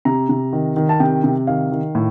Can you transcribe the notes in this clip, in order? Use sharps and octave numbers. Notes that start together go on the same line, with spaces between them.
C3 A#5
C3
D#3
D#3
A5
C3 G5
C3
D#3 F5
D#3
A2